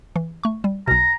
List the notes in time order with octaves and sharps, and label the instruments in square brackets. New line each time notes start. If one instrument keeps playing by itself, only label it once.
[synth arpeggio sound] E3
A3 C#6
G3
[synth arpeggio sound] B1 B2 [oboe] A#5